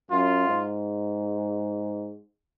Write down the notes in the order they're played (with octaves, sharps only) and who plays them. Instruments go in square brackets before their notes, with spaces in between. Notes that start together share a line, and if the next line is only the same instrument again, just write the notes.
[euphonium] F#2 [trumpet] F4
[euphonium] G#2